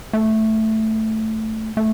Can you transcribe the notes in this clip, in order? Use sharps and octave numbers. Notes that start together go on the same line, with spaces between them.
A3
A3